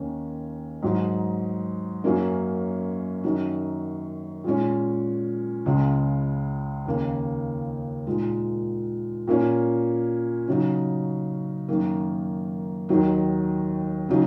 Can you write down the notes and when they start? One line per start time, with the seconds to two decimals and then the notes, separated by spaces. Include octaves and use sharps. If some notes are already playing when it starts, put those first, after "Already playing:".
Already playing: D#2 D#3 A#3 C#4
0.82 G#2 F#3 D#4
2.04 F#2 F#3 A#3 C#4
3.24 F#2 D#3 F#3 D#4
4.44 A#2 G#3 C#4
5.66 C#2 C#3 G#3
6.86 D#2 C#3 A#3
8.07 A#2 G#3 D#4
9.28 A#2 A#3 C#4
10.48 C#3 F#3 D#4
11.68 F#2 D#3 A#3 D#4
12.89 D#2 D#3 F#3 D#4
14.09 C#3 F#3 D#4